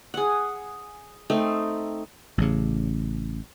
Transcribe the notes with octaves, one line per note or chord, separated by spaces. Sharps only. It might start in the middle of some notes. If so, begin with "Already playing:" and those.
G#4 F#5
A3 C4 D#4
A1 C#3